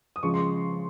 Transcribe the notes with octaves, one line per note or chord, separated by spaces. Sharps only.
D#6
C#3 F3 G#3 C#6
C6